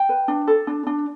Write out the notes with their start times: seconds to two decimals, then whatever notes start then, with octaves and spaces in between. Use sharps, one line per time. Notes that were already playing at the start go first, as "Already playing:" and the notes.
Already playing: G5
0.09 B4
0.28 D4
0.48 A4
0.67 D4
0.87 D4